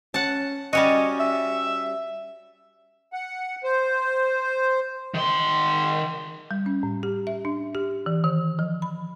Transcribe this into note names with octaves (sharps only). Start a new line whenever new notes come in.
C#4 F#5 A5
G3 C#4 F#4 D#5
E5
F#5
C5
D#3 C6
G3
C#4
A2
G4
E5
D4
G4
E3
D#3
F3
B5